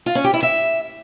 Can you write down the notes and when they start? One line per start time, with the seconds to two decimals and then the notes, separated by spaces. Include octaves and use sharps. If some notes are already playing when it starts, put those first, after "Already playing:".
0.06 F4
0.15 C#4
0.24 G4
0.34 E4
0.43 E5